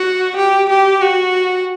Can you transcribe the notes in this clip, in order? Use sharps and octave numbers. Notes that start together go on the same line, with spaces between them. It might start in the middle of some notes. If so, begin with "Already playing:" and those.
Already playing: F#4
G4
G4
F#4